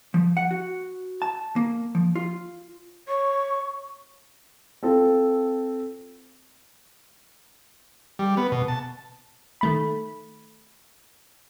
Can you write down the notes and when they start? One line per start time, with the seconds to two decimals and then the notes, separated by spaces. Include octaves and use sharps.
0.14 F3
0.37 F#5
0.51 F#4
1.22 A5
1.56 A#3
1.95 F3
2.16 F4
3.08 C#5 C#6
4.83 C4 F4 A4
8.19 G3
8.37 B3
8.52 B2
8.68 A5
9.61 D#3 A3 B5